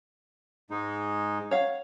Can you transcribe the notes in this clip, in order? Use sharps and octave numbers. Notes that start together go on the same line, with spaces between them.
G#2 G#3 D#4
C#5 F5 F#5